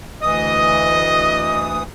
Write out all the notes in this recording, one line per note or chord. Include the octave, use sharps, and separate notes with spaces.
D2 E3 D#5 D#6